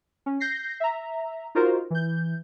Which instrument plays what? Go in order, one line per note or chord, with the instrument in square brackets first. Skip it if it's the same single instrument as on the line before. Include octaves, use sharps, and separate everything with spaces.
[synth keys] C#4
G6 A#6 C7
E5 A#5
D#4 F4 F#4 A#4 C5
E3 G6